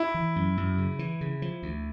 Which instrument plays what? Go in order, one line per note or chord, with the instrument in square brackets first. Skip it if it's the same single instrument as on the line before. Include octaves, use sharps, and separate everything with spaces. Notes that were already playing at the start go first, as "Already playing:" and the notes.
Already playing: [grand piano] E4
[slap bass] E3
F#2
F#2
C#3
E3
C#3
F3
D2